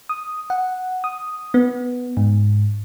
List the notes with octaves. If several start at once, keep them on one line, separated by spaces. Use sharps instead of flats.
D#6
F#5
D#6
B3
G#2